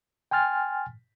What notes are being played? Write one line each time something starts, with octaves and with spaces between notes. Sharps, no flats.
G5 G#5 C6 F6 A6